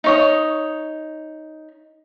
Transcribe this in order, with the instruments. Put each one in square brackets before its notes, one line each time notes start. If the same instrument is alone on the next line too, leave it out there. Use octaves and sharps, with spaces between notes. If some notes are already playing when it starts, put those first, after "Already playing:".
[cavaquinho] D#4 C#5 D#6